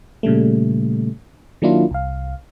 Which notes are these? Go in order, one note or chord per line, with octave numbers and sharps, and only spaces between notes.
A#2 C#3 G3 A3
D#3 F#3 A#3 D4 E4 F4
C2 F5